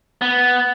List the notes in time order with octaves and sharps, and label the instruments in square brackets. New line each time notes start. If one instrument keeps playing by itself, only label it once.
[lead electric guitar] B3